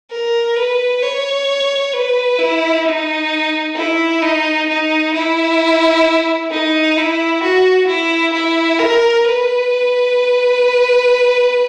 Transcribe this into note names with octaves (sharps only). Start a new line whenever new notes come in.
A#4
B4
C#5
B4
E4
D#4
E4
D#4
D#4
E4
D#4
E4
F#4
E4
E4
A#4
B4